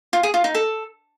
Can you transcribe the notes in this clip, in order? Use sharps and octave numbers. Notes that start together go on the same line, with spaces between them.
F4
G#4
F4
D#4
A4